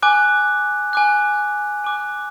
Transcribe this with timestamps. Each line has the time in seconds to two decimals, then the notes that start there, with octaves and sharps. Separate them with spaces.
0.02 G#5 D6 F#6
0.93 G#5 D6 F#6
1.84 G#5 D6 F#6